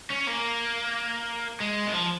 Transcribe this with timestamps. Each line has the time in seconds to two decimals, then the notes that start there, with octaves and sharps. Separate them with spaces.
0.10 C#4
0.27 A#3
1.60 G#3
1.87 D#3
1.93 F3